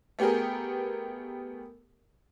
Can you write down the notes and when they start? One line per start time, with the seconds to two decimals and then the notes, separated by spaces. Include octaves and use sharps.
0.19 A3 B3 G4 G#4 A#4